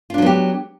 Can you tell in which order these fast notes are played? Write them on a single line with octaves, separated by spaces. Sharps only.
F4 D4 F#3 B3 G4